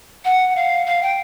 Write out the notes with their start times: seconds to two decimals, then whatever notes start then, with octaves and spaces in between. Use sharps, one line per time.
0.24 F#5
0.55 F5
0.86 F5
1.02 G5